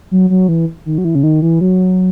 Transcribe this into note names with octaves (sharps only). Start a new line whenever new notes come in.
F#3
F#3
E3
D#3
F#3
E3
C#3
D#3
E3
F#3